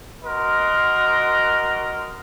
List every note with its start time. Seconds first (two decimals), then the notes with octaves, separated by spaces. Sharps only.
0.25 F#4 A#4 D#5 C6